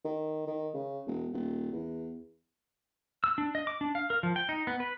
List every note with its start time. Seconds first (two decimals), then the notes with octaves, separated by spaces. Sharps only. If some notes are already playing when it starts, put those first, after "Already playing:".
0.05 D#3
0.47 D#3
0.74 C#3
1.06 E1
1.32 D#1
1.72 E2
3.24 E6
3.38 D4
3.55 D#5
3.67 D6
3.81 D4
3.95 F5
4.10 A#4
4.23 F3
4.36 G5
4.49 D#4
4.67 B3
4.80 B4